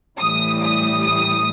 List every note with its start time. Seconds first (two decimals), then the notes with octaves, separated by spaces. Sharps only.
0.19 A2 E3 G3 D#6
0.61 D#6
1.02 D#6